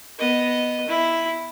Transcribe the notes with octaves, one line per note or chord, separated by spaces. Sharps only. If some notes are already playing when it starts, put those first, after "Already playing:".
B3 D#5
E4